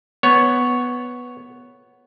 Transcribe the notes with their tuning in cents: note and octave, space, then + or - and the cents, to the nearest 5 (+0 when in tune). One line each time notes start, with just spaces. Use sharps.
B3 +0 C#5 +0